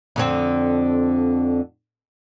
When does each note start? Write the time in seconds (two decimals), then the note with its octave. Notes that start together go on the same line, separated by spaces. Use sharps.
0.16 F2 D3 C4